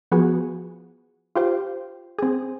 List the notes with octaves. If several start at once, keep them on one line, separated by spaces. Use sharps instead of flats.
F3 B3 F#4 G#4
F4 G4 C5
C4 G#4